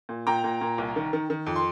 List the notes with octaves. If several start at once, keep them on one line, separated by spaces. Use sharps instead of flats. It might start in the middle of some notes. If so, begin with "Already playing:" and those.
A#2
A#2 G5 A#5
A#2
A#2
C2
D#3
D#3
D#3
F2
C6